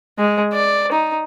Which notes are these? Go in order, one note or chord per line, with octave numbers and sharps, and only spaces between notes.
G#3
D5
D#4